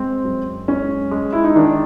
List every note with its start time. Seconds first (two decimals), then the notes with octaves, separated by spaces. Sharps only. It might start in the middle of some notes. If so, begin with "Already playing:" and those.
Already playing: G#3 C4
0.25 F#2
0.68 G#3 C#4
1.11 G#3
1.32 E4
1.44 D#4
1.55 D#3 D4